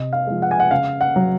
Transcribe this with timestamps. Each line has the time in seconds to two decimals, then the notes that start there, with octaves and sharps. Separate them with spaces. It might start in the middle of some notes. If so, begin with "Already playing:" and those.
Already playing: C3 D#5
0.13 F5
0.27 F3 G#3
0.42 F#5
0.51 G#5
0.60 F#5
0.71 C#3 F5
1.01 F#5
1.16 F#3